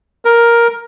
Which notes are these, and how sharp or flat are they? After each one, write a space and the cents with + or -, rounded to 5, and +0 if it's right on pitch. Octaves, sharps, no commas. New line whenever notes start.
A#4 +5